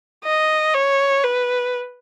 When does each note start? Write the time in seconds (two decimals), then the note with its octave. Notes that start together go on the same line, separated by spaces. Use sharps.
0.24 D#5
0.74 C#5
1.24 B4